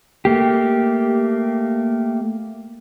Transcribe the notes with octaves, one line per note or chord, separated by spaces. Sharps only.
A3 A#3 G4